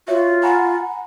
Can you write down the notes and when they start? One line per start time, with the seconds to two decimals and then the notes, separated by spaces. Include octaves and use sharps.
0.08 F4 F#4 C#5 E5
0.43 F#5 G#5 A#5 B5